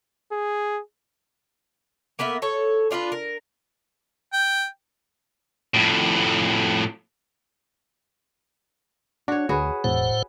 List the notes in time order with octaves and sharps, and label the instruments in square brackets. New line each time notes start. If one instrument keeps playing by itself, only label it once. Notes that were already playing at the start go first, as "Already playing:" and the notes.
[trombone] G#4
[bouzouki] A#3 B3 A#4 E5
A4 C#5
D4 F4 G4 B4
A#4
[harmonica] G5
[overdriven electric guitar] F2 A2
[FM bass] D4 [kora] F#4 C#5
[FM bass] D2 [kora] F#4 G#4 B4
[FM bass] E1 [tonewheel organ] A2 C5 F#5